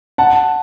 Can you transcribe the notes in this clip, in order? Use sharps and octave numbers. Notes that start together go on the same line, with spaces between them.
F#5 A5